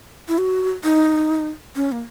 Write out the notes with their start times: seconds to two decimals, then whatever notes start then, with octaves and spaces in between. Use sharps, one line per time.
0.28 E4
0.38 F#4
0.84 D#4
1.76 C#4
1.92 A#3